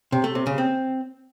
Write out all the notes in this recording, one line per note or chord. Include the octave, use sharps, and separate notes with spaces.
C3
A3
C3
C#3
C4